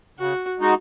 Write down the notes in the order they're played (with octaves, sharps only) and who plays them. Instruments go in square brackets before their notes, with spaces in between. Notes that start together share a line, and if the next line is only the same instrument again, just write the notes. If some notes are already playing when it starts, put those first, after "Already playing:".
[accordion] C#3 [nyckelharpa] F#4
[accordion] G#3 D#4 F#4